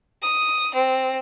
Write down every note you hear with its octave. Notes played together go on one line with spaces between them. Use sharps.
D#6
C4